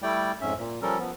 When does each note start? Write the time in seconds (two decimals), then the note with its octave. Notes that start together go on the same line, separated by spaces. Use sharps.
0.02 G3 A3 E4 D5 G5
0.41 F2 G#2 C#4 E5
0.58 A#2
0.82 F3 G3 C#4 A4 A#4
0.99 F3 B3